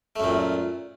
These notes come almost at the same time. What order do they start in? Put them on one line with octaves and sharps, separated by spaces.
A3 F#2 A#2